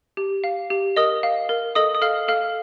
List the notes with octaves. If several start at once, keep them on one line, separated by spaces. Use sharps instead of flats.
G4
F5
G4
A#4 D#5 D#6
F5
A#4
A4 D#5 D#6
D#6
A4 F5 F6
A4 F5 F6